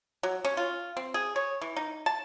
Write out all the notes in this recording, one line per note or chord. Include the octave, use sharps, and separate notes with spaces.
F#3
C#4
F4
C4
G#4
C#5
E3
D#4
A5